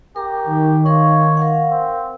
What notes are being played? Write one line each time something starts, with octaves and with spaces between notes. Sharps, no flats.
G4 A#4 A#5
D#3
D#4 A#4 C#5 F5
A#4 F5 F#5
C4